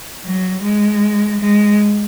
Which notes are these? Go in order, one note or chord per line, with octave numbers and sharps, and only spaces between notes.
F#3
G#3
G#3